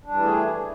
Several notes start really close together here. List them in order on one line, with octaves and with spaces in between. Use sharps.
D4 G3 E3 A3 G#4